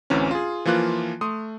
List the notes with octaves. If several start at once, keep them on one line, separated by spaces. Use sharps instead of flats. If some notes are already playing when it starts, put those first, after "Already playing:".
A1 D2 E3 C4 C#4
F4 G#4
E3 F3 A#3 F4 F#6
A3 C6 D#6